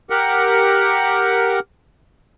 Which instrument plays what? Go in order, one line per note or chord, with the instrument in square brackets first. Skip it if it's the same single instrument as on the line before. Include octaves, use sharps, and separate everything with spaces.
[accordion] G4 A#4 F#5